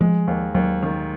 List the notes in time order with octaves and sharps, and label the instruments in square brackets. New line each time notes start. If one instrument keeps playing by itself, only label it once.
[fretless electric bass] F3 [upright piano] G#3
[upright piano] D#2
[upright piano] D#2 [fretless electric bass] F#3
[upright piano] D#3